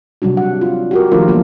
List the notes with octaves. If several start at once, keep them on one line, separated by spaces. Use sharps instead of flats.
C3 F#3 G3 D4 F#4
F#5
F4
F#4 G4 A#4
D#3 F3 A3 D4 F4 A#4
E3 F#3 A#3 B3 F4